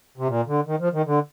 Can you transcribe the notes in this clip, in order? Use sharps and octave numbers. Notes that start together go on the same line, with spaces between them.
C3
A#2
D3
D#3
F3
D#3
D3